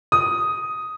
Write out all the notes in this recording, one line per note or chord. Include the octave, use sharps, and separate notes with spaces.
D#6